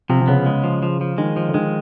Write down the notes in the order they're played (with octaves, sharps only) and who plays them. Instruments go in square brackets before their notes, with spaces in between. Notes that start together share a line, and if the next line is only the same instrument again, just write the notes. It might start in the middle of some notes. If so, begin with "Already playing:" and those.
[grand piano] C3 [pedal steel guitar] F3
[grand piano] C3
[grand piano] C#3 [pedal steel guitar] B3
[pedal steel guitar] G#3
F3
F3
F3
[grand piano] D#3 [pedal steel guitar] G#3
[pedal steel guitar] F3
[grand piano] D3
[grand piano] D#3 [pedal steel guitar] G#3